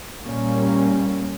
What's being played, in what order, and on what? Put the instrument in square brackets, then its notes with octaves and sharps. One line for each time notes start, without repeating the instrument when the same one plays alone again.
[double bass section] A#2 G3 A#3 C#4